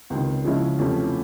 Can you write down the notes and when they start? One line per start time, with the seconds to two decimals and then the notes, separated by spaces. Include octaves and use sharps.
0.10 C#2 C3 D#3
0.44 C#3 F3 G#3 C#4 E4
0.79 E2 C3 F3 A3 C#4